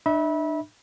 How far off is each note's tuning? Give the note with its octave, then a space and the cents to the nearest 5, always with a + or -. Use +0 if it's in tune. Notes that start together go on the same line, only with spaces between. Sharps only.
D4 +40 E5 -25 B5 -25